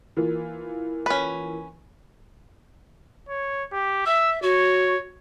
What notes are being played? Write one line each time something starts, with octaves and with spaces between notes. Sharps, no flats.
E3 A#3 F4
C#4 B4
C#5
G4
E5 E6
F#4 C#5